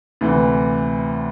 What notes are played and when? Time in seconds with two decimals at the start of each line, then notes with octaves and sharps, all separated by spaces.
0.21 D2 C3 E3